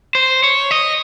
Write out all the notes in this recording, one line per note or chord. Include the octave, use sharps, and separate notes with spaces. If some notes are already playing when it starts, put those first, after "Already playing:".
C5
C#5
D#5